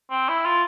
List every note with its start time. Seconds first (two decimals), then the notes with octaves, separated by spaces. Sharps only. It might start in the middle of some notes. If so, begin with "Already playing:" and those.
0.11 C4
0.28 E4
0.45 F4